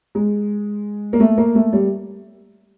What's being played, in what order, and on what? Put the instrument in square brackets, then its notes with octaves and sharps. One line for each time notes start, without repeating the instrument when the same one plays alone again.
[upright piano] G#3
A#3
A3
A#3
A3
G3